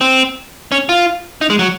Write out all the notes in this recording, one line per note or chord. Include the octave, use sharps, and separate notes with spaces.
C4
C#4
F4
D#4
G#3
F#3